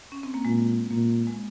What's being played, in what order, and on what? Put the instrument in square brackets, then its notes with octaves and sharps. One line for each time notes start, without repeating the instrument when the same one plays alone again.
[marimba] C#4
C4
A#3
[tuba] A#2 [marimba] G#3
[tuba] A#2 [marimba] A#3
[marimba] G#3